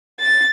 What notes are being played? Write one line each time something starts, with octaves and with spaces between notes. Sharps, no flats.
A6